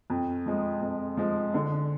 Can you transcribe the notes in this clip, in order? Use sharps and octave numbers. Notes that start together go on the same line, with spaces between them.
F2
F3 G#3
F2
F3 G#3
D3